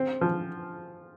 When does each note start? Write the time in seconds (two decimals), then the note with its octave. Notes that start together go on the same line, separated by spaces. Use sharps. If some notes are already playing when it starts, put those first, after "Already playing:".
Already playing: C4
0.21 F3